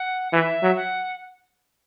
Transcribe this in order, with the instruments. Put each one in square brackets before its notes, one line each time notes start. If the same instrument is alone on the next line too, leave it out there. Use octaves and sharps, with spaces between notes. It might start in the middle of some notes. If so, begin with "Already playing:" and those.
Already playing: [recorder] F#5
[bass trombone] E3 [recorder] E5
[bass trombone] F#3
[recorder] F#5